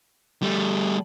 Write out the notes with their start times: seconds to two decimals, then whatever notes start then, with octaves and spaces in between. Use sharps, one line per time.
0.43 G3 A3